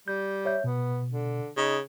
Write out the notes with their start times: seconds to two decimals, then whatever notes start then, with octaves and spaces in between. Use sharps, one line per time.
0.08 G3 G6
0.45 C#5 E5 G6
0.64 B2 B3
1.11 D3
1.57 C#3 D#4